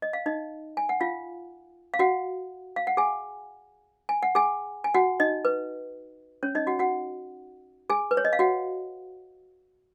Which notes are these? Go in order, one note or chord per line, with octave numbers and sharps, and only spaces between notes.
D#5
F5
D#4 D#5
G#5
F#5
F4 F5
F5
F#4 F#5
F5
F#5
G#4 G#5
G#5
F#5
G#4 G#5
G#5
F#4 F#5
D#4 D#5
B4
C#4 C#5
D#4 D#5
F#4 F#5
F#4 F#5
G#4 G#5
B4
C#5
D#5
F5
F#4 F#5